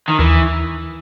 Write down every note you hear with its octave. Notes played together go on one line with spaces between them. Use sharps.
D#3
D#2 E3